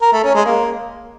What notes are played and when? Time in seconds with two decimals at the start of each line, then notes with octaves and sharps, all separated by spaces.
0.02 A#4
0.13 A3
0.24 C#4
0.35 G#3
0.46 A#3